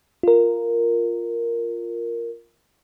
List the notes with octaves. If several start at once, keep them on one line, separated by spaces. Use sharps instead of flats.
F4 A#4